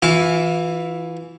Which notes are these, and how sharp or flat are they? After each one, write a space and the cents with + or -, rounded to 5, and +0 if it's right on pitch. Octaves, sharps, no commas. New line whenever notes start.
E3 +0 F4 +30 D6 -40